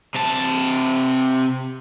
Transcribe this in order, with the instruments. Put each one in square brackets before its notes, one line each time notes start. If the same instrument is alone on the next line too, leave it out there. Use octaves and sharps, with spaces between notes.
[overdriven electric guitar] C3 A5